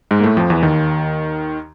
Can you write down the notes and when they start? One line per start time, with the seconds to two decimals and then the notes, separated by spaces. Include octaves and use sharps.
0.11 G#2 G#3
0.20 A#3
0.23 A2 A3
0.37 F2 F3
0.50 E2 E3
0.63 D#2 D#3